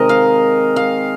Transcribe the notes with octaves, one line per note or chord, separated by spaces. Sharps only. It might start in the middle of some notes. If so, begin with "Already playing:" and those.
Already playing: C3 D#3 G#3 A#4 D#5
F5
F5